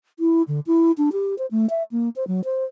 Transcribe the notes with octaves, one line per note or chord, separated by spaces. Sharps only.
E4
D3
E4
D4
G4
C5
A3
E5
A#3
C5
F#3
C5